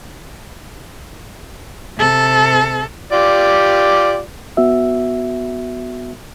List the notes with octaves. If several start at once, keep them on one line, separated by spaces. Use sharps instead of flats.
C3 A4
F4 G4 D5
B3 F#4 E5